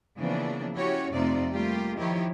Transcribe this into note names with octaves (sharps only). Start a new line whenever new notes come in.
C#3 E3 F3 A#3 B3 D4
C#4 E4 F#4 G4 C#5
F2 C3 A3 D#4 F4 D5
G3 A3 A#3 F4 G4
D#2 D#3 F3 E4 G4 C#5